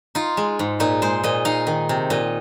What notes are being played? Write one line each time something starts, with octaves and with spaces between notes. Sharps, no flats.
D#4 F4
G#3
G#2
A#2 D#4
G#3 C5
A#2 D#5
D#4 F5
D#3
C3
A#2 D#5